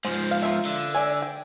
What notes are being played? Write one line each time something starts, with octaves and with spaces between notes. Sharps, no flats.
G#2 F3 C5
F5
F4 A#4 E5
D3
D5 E5 G#5
G5